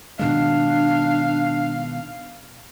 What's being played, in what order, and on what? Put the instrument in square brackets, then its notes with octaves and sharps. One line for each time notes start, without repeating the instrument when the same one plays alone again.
[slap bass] B2 D#3 G#3 [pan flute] D4 [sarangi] F5